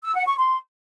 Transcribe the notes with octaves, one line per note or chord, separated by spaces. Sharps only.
E6
F#5
C#6
C6